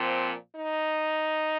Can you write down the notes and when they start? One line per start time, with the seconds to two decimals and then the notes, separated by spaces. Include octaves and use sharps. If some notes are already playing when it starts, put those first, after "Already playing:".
Already playing: A#2 F3 C4
0.55 D#4